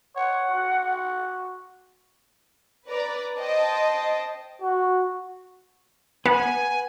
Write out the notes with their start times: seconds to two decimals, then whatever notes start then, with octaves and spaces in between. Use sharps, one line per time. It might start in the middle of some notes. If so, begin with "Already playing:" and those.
0.16 C#5 F#5
0.50 F#4
2.88 B4 D5 A#5
3.38 C5 D#5 G5 A5
4.62 F#4
6.26 B3 B4 F#5 G#5